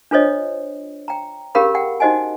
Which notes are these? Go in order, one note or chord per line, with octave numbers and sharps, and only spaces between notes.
D4 F4 A4 C5 C#5 D#5
G5 A#5
C#4 G4 G#4 A#4 F5 B5
F#5 G5
D#4 F#4 C5 D#5 F#5 G#5